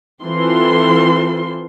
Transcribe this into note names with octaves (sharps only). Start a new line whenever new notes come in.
E3 C4 F4 A4 C6